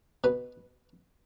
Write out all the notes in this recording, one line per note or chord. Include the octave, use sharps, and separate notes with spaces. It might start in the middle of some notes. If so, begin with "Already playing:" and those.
B2 B4